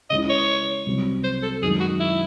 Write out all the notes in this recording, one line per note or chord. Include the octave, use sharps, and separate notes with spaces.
C#3 G#3 C#4 E4 D#5
C#5
C2 C3 F#3 C4
C5
A4
F#2 D#3 G#3 G#4
F#4
E4